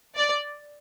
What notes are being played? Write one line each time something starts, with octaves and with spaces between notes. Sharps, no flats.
D5